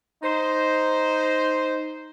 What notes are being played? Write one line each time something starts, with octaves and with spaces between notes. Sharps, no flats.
D#4 C5